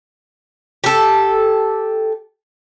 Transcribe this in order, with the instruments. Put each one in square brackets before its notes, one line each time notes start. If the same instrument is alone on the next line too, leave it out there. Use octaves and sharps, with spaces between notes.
[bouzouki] G4 A4